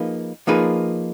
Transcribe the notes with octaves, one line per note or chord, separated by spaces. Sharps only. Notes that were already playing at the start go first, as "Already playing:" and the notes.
Already playing: F3 A#3 D#4 G#4 B4
F3 A#3 D#4 G#4 B4